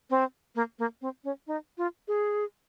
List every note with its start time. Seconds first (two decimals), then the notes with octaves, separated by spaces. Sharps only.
0.10 C4
0.55 A#3
0.79 A#3
1.02 C4
1.24 C#4
1.47 D#4
1.78 F4
2.08 G#4